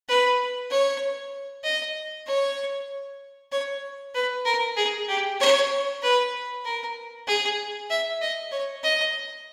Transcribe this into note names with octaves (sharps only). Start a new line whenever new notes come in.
B4
C#5
D#5
C#5
C#5
B4
A#4
G#4
G4
C#5
B4
A#4
G#4
E5
D#5
C#5
D#5